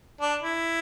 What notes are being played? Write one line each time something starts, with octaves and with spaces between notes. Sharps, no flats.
D4
E4